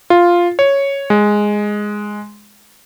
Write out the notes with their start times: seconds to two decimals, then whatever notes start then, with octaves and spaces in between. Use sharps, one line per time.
0.10 F4
0.59 C#5
1.10 G#3